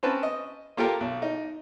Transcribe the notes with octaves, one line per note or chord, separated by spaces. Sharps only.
C4 C#4 B4 A5
D#5
A#3 F4 G4 A4 A#4
B1
D#4